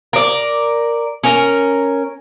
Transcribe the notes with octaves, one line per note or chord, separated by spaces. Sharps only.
A#4 D5
C#4 A#4